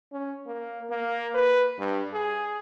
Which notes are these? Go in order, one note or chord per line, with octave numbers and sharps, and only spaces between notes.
C#4
A#3
A#3
B4
G2
G#4